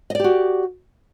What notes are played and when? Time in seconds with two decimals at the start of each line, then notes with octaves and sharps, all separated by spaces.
0.10 D#5
0.15 D5
0.20 G4
0.24 F#4